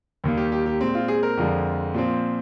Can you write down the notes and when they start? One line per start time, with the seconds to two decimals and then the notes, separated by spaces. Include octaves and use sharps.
0.24 D#2 D#3 G3 A#3
0.37 G4
0.52 G4
0.66 G4
0.81 A#2 G#3 C4
0.95 F4
1.08 G#4
1.23 A#4
1.37 F2 D3 F3 G#3
1.94 A#2 F3 C4